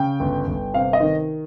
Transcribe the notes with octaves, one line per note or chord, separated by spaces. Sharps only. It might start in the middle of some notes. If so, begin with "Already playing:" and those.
Already playing: C#3 G5
G1
G1
C3 F5
D#5
D#3